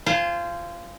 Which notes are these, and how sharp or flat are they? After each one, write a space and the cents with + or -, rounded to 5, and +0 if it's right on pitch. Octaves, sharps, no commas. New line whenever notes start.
F4 -20 C5 +0 G#5 +0